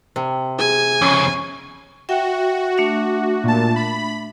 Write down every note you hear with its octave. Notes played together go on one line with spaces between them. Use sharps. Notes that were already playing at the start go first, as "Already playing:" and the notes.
C3
G#4 G#5
F2 C#3 C#4
F#4 E5 G5
A3 D4 E5
A#2 A5
B5